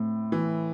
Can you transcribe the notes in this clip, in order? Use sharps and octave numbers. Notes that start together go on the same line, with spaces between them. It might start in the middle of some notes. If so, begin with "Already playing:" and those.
Already playing: A2 C4
E3